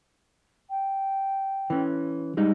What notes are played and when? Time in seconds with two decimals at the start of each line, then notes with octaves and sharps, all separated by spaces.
0.69 G5
1.70 E3 C#4
2.37 G3 G#3 D#4